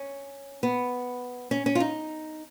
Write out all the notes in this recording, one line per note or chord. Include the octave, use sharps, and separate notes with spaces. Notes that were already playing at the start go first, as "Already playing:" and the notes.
Already playing: C#4
B3
C#4
C#4
F4
D#4